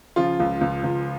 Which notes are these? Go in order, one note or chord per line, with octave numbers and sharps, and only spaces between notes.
C#3 F3 F4
C#2
C#2
C#2